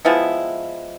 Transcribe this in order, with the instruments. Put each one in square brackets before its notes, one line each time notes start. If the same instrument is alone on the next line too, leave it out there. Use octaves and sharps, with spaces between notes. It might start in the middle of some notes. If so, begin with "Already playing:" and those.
[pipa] F3 G#3 B3 E4